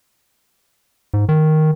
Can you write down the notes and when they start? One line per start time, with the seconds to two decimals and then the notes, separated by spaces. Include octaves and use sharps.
1.14 G#2
1.29 D#3